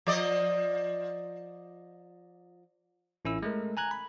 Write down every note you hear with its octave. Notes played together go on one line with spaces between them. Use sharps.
F3 D5 D#5
A1 C#4 E4 E6
G#3 A3 A#4
G#5 A#5 F#6 G#6
B5